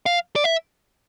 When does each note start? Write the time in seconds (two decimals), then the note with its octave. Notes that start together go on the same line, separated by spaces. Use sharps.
0.06 F5
0.36 D5
0.44 E5